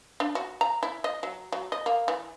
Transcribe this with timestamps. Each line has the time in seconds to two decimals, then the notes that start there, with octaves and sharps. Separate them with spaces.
0.20 D4
0.35 F#4
0.61 A#5
0.83 E4
1.04 D#5
1.23 F#3
1.52 F#3
1.72 D#5
1.86 A#3
2.08 E3